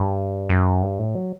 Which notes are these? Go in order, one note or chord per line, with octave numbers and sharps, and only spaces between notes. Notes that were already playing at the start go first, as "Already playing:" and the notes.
Already playing: G2
F#2
G2
A2
F#3